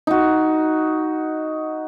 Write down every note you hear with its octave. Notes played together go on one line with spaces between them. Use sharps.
D#4 F#4